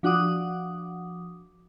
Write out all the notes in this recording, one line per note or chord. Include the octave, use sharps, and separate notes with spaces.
F3 D4 F#4 F#5 D6 D#6